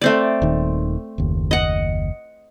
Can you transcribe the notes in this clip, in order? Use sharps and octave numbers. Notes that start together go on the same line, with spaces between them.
A3 C4 D5
D#1 D#3
F#1 D#2
D#5 F#5